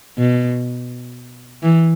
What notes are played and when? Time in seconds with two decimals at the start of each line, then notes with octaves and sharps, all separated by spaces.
0.18 B2
1.63 E3